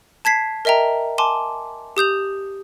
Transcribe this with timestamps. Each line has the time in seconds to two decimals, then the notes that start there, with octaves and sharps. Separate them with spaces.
0.25 A5 G#6 B6 C7
0.65 A#4 D#5 E5 G5 A#5
1.18 G#5 A5 C6 D6
1.97 G4 D#6 G6 F7